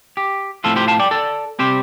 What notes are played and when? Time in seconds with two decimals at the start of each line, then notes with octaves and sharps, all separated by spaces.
0.17 G4
0.64 A2 F3 A3 C4 F4 A4
0.76 G4 C5
0.88 F5 A5
1.00 D5 G5
1.11 A4 D5
1.59 C3 G3 C4 G4 C5